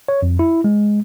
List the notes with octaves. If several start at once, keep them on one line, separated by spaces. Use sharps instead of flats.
C#5
F2
E4
G#3